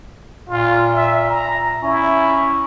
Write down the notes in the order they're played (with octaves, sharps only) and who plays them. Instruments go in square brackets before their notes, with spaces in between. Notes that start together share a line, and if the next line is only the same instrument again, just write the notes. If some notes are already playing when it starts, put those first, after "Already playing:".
[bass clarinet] A#2 [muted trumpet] F4
[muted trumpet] E5
A#5
[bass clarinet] C#4 [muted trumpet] E4